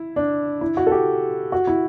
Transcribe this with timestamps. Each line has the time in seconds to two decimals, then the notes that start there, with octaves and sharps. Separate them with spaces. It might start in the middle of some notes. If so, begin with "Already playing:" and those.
Already playing: E4
0.16 D4
0.61 E4
0.77 F#4
0.87 A4
0.92 G4
1.52 F#4
1.67 E4